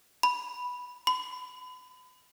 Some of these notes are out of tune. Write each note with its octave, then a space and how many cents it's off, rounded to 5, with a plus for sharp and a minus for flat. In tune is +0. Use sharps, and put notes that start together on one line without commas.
B5 +0
B5 +35